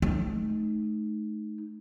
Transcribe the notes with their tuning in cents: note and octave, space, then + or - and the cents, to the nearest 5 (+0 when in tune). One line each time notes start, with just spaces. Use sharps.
A3 -35 D#4 +0